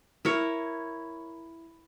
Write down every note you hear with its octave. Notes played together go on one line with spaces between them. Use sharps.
E4 A#4 C#5